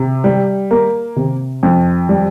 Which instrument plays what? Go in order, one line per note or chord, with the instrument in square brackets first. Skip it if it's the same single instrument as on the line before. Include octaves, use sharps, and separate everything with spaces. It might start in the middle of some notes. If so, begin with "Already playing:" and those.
Already playing: [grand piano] C3
G3
A#3
C3
F2
G3